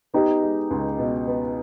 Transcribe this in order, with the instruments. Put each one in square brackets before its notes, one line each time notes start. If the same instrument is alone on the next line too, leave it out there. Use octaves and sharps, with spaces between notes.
[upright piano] B3 [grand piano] D#4 G4
[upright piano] G#3
C#2
B2
B3